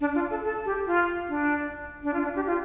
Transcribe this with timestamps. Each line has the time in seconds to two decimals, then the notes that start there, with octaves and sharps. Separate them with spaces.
0.01 D4
0.15 F4
0.30 A4
0.44 A4
0.65 G4
0.86 F4
1.29 D4
2.03 D4
2.13 F4
2.24 D4
2.36 G4
2.47 F4